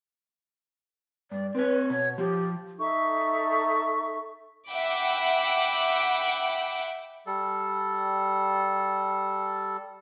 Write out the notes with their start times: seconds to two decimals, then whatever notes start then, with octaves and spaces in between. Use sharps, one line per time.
1.32 G2 D5
1.55 C4 B4 C#5
1.90 B2 C#5
2.18 F3 G4
2.78 D#4 A4 E5 C#6
4.70 E5 F#5 G5 B5 D6
7.27 G3 A4